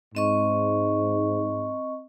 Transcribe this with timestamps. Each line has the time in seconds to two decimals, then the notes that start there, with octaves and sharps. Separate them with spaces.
0.15 G#2 C4 D#5 C#6